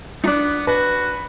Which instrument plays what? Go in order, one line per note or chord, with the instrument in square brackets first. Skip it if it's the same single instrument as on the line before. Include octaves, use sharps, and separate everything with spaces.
[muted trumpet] B3 [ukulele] D4 D#4
[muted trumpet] F#4 [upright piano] B4